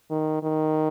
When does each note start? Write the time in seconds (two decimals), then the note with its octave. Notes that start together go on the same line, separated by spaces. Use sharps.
0.10 D#3
0.43 D#3